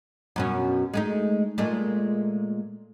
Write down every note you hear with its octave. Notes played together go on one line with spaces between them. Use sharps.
F#2 B2 C#4
G#3 A3 D#4
A#2 G#3 A3